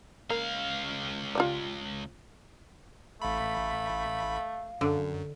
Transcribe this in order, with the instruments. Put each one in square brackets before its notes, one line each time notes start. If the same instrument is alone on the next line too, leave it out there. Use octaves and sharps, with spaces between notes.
[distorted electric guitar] C#2 F5 [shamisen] A#3
[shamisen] F4 G4 D5
[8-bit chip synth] A1 B5 [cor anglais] A3 [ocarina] F5
[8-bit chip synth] F#2 [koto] D3